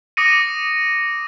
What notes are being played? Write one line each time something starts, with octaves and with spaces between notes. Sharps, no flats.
D6 D#6 A#6 C#7 D#7